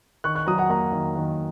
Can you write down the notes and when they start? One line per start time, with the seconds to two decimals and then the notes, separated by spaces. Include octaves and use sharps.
0.24 D#3 C#6 F#6
0.35 C#6 F#6
0.47 F#3 A#5 D#6
0.58 F#5 A#5
0.70 A#3 F#5 A#5
0.92 D#3
1.16 D#3